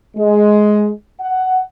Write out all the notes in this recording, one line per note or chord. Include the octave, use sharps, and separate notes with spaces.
G#3
F#5